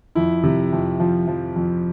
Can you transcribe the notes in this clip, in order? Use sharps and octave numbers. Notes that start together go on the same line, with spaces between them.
F2 E4
C3
F2
F3
F3
F2